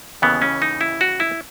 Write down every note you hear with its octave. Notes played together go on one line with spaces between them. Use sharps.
D#2 C#3 E3 B3
C#4
D#4
E4
F#4
E4